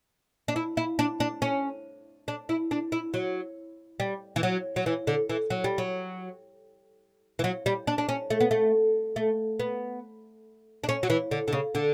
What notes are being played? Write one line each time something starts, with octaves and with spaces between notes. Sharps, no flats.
D4
E4
E4
D4
D4
C#4
D4
E4
D4
E4
F#3
G3
E3
F#3
F#3
E3
D3
E3
F#3
G3
F#3
E3
F#3
G3
D4
D4
C#4
A3
B3
A3
A3
B3
D4
C#4
F#3
E3
D3
D3
C#3
D3